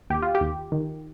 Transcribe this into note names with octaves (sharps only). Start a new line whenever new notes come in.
D#2 G4
F4
G4
D#2
D#3